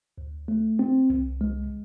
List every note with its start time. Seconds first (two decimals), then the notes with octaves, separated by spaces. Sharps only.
0.18 D2
0.48 A3
0.79 C4
1.10 C2
1.41 G#3